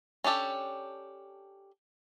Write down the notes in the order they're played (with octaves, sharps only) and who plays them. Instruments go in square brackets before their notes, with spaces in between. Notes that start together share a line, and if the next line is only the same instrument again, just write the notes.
[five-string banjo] C#4 D4 G4 A4